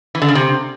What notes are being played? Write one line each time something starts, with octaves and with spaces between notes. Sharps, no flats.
E3
D3
C#3
C3